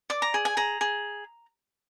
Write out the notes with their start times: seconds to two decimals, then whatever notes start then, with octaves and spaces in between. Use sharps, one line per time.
0.10 D5 D6
0.22 A#5
0.34 G#4
0.45 G#5
0.57 G#4 A#5
0.81 G#4